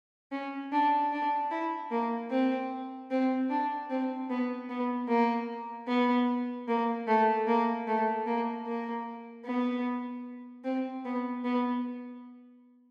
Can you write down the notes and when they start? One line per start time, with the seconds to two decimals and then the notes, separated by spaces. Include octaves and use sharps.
0.32 C#4
0.72 D4
1.12 D4
1.51 E4
1.91 A#3
2.30 C4
3.10 C4
3.50 D4
3.90 C4
4.30 B3
4.69 B3
5.08 A#3
5.88 B3
6.68 A#3
7.07 A3
7.47 A#3
7.87 A3
8.26 A#3
8.67 A#3
9.45 B3
10.64 C4
11.05 B3
11.44 B3